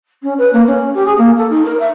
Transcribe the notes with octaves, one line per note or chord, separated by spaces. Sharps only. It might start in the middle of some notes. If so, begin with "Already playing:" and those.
C#4
B4
A#3
C#4
G4
G#4
A#3
A4
D#4
A#4
E5